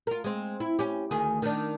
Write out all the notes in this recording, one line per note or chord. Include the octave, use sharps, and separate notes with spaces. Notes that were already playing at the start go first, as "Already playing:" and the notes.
F4 A#4
G#3 C4
E4
C#4 G4
D2 D#3 G#4
D#3 D4